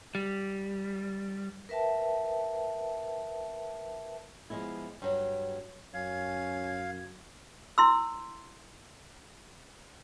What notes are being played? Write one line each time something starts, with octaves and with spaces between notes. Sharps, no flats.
G3
A#4 B4 E5 G5 A5
F3 G#3 B3 E4
G2 F#3
F#2 C#4 F5 G#6
E4 C6 E6